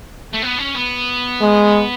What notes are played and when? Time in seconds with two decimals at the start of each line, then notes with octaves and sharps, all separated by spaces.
0.34 A3
0.43 B3
0.59 C#4
0.76 B3
1.41 G#3